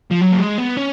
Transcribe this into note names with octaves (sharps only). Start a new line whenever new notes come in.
F3
F#3
A#3
G#3
B3
C#4